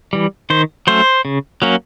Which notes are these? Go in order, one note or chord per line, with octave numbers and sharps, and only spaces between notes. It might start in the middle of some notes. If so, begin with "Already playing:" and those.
E3 G3
D#3 C5
F#3 A3 C#4 C5
C#3
F#3 A#3 C#4